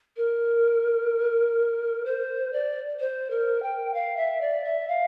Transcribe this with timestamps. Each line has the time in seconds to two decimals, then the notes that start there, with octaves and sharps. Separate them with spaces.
0.17 A#4
2.05 C5
2.53 D5
3.00 C5
3.30 A#4
3.63 G5
3.94 F5
4.17 E5
4.41 D5
4.64 E5
4.88 F5